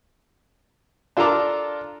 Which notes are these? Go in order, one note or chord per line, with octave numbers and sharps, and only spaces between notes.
D4 F4 A4 A#4 A#5 D6